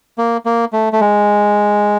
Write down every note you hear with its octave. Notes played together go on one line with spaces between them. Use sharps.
A#3
A#3
A3
A3
G#3